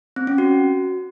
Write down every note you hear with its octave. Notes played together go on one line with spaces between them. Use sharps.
C4
C#4
F#4